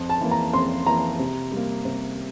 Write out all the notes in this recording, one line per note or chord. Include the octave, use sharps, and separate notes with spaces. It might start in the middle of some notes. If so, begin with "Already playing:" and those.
Already playing: F2
A5
E3 A#3
A#5
F2 C6
E3 A#3 A#5
C3
G3 A#3
C3